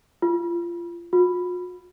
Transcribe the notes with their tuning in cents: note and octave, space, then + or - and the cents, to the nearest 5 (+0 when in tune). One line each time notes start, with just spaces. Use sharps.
F4 -25
F4 +45